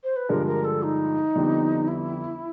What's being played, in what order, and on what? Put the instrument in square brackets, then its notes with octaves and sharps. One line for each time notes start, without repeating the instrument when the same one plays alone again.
[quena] C5
B4
[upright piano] G2 D3 F3 G#3 [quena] A#4
[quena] A#4
A4
D#4
[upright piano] F2 D3 G3 B3
[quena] E4